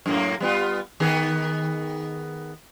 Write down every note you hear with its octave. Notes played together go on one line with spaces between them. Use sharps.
F#2 A2 A#3
G3 B3 F4
D#3 B3 G#4